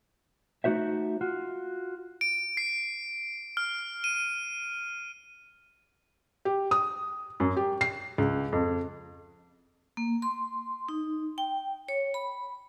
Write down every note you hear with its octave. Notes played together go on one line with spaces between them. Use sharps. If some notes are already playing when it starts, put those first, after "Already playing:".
A3 D#4 F#4 C5 E5
F4 F#4
D7
C7
F6
D#7
G4
D#6
F#2
G4
C7
C#2
F2
A#3
C6
D#4
G5
C#5
B5